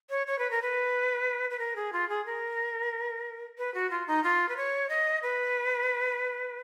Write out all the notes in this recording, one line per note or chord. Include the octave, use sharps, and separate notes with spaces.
C#5
C#5
B4
A#4
B4
B4
A#4
G#4
F4
G#4
A#4
B4
F#4
F4
D#4
F4
B4
C#5
D#5
B4